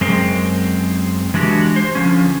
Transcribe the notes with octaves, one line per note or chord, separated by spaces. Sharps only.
F#2 G#3 C4
E3 G#3 D4 F#4 G4
C5
D3 F3 C#4